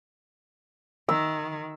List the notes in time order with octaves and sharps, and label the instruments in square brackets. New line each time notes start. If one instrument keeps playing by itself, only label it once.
[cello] D#3 [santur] E6